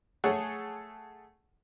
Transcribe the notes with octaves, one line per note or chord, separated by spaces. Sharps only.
A3 G#4 A4 C#5 F#5